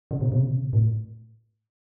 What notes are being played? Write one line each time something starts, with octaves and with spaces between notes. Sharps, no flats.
C#3
B2
B2
C#3
B2
C#3
B2
A2